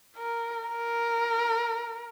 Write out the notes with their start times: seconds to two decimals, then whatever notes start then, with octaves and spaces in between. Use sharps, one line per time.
0.17 A#4
0.69 A#4